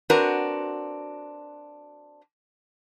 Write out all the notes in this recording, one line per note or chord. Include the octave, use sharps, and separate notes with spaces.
C4 D4 F#4 A#4 B4